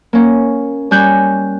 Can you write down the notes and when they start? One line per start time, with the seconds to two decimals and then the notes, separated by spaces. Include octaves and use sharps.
0.13 A#3 C#4
0.91 G3 C#4 G#5 F#6 G6